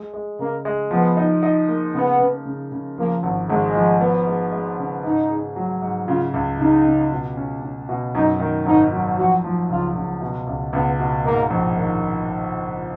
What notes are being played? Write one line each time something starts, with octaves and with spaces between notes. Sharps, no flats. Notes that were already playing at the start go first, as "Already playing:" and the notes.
Already playing: G#3
G#3
C#3 A#3
G#3
F3 B3
D#4
D#4
A#3
C#3 B3
C#3
C#3
C#3
F3 A#3
G#1
G#1 G#3
F3
B3
G#3
G#3
C#3
G#2 D#4
G#4
F#3
G#2
C#3 F4
C#2
C#3 D#4
C#3
B2
C#4
C#4
B2
F#2 D#4
D#3
G#1 D#4
F#3
F3 F#4
F3
C#2 F4
C#2
B2
C#2
C#2 B3
B2
G#2 A#3
A#1
D#3